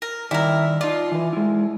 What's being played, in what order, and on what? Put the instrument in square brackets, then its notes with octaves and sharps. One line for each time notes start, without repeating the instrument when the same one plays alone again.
[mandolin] A#4
[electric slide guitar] D#3 G3 D5 [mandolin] E4 A#4
[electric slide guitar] D#4 D5 [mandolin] F4
[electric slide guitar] E3 B4
G#3 E4